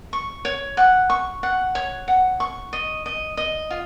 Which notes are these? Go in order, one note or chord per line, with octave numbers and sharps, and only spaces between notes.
C#6
C#5
F#5
C#6
F#5
C#5
F#5
C#6
D#5
D#5
D#5
F4